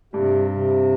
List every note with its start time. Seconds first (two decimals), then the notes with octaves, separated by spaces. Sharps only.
0.13 G2 C3 G3
0.50 C3